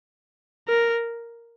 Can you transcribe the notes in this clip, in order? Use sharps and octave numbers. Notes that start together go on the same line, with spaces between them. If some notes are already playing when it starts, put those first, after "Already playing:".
A#4